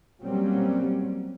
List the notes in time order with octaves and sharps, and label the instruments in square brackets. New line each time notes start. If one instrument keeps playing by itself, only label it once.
[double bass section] F#3 G3 A#3 C4 C#4